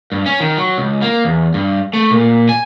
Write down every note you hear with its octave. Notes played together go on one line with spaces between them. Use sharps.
G2
C#4
D#3
F#3
C#2
A#3
E2
G2
A3
A#2
G#5